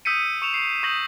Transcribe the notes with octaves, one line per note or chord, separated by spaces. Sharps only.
D#6 E6 G6 B6 C#7 D#7
C#6 C#7 E7 F7
C7
C#6 D#6 G6 A#6 E7 F#7